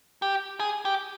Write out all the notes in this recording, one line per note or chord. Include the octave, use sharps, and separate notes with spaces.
G4
G#4
G4